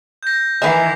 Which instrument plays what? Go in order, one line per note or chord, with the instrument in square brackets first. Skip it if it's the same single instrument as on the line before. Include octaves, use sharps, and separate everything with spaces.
[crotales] G6 A#6
[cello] D#3 E3 [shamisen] B4 E5 [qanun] G#5 [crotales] D6 C7 F7